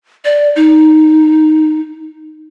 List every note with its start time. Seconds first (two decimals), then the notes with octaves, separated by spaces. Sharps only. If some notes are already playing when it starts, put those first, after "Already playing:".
0.25 D5
0.56 D#4